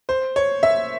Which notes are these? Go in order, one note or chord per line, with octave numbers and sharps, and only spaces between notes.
C5
C#5
E5